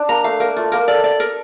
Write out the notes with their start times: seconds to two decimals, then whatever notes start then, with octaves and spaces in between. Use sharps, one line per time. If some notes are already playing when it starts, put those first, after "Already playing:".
Already playing: D4
0.09 A#3 A#5
0.24 A3 F5
0.40 A#3 A#4
0.56 A3 F4
0.72 A#3 A#4
0.88 A4 D5
1.04 D5
1.20 A#4